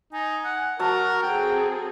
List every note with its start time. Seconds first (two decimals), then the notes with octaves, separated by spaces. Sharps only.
0.13 D#4 G#5
0.45 F#5
0.79 F#3 F#4 A#4 A5
1.23 C4 G#4 A4 G5